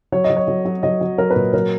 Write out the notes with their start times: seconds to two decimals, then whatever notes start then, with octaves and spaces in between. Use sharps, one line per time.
0.12 F#3 C#5
0.24 D#5
0.30 F#3
0.37 C#5
0.48 F#3
0.65 F#3
0.83 F#3 D#5
1.01 F#3
1.18 F#3 A#4
1.30 B4
1.36 A#2
1.53 F#3 A#4